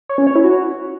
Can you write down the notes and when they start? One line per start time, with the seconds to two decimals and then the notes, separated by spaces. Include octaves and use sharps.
0.09 C#5
0.18 C#4
0.27 C#5
0.35 E4
0.44 F#4